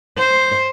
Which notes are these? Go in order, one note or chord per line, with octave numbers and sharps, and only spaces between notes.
C5